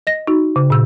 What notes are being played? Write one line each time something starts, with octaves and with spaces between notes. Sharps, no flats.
D#5 A#6
D#4 F#4
C#3
A#2 E6